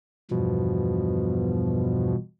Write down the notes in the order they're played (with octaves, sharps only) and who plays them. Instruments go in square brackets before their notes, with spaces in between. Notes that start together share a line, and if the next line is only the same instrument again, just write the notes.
[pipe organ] E2 G2 F3 [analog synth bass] B2